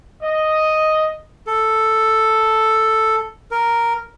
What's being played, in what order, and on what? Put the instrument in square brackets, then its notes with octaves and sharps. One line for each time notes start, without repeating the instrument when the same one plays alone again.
[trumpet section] D#5
[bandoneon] A4
A#4